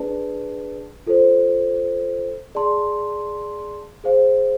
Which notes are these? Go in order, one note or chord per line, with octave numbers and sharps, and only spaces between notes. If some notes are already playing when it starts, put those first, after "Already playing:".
Already playing: D4 G#4 B4 D5 A5
F4 A4 C5
G#4 D5 A5 C6
G#4 C5 F5